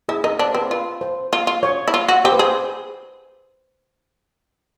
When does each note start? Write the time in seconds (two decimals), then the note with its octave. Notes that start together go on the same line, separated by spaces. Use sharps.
0.09 E4 G#4
0.24 D#4 A#4
0.39 D4 C5
0.54 C4 B4
0.71 F4 B4
1.01 C5
1.33 F4
1.47 F4
1.63 C#5
1.88 E4
1.94 F4
2.08 F#4
2.25 G4 C5
2.32 B4
2.39 G#4 C5